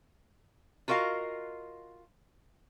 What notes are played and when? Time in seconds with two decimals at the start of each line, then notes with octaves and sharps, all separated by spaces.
0.88 F4 F#4 A#4 D#5 F5